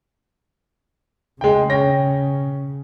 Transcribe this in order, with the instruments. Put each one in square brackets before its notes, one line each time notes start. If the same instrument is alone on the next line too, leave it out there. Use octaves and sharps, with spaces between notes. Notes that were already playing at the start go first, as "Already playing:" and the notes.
[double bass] C#3 [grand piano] G#3 G5
[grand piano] C#4 G5 A#6